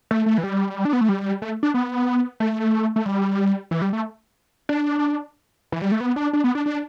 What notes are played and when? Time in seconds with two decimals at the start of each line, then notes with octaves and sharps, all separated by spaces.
0.11 A3
0.26 A3
0.38 E3
0.43 G3
0.85 D4
0.93 B3
1.01 A3
1.09 G3
1.42 A3
1.63 D4
1.74 B3
2.40 A3
2.96 A3
3.06 G3
3.71 E3
3.82 G3
3.93 A3
4.69 D4
5.72 E3
5.82 G3
5.92 A3
6.01 B3
6.16 D4
6.33 D4
6.44 B3
6.55 D4
6.66 D4